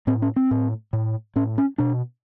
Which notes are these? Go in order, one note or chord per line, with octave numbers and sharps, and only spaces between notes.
A2 C4
C#4
C4
A2
A2
A2 C#4
C#4
B2 D4